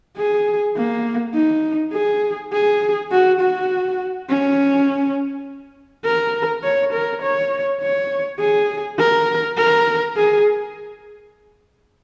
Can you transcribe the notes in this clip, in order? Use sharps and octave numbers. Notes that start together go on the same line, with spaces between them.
G#4
A#3
D#4
G#4
G#4
F#4
F#4
C#4
A#4
C#5
A#4
C#5
C#5
G#4
A#4
A#4
G#4